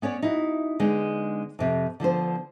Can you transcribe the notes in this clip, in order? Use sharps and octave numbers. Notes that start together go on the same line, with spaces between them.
B3 C#4 C#5 D5
D#4 E4 F#4
D3 G#3 B3 D#4
F2 C3
D3 F3 B3 C5